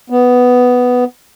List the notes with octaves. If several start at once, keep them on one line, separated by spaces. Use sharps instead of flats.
B3